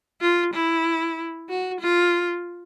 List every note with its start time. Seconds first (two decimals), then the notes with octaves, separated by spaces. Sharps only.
0.21 F4
0.54 E4
1.49 F#4
1.81 F4